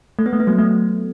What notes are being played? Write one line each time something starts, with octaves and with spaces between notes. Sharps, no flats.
A3
B3
A3
B3
F#3 A3
F#3 A3